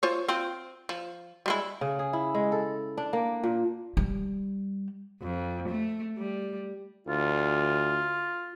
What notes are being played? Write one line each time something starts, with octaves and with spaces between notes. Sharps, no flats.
F4 C5 C#5
C4 F4
F3
G3 G#3 E4
C#3
G#4
E4
G#3
A4
D4
A#3
A#2
G3
F2
A3
G3
D2 F4